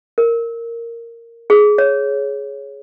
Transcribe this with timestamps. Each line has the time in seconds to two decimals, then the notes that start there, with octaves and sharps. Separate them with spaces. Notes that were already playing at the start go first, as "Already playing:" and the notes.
0.18 A#4
1.50 G#4
1.78 C#5